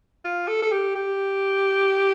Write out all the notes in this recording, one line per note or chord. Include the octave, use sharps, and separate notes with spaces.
F4
A4
A4
G4
G4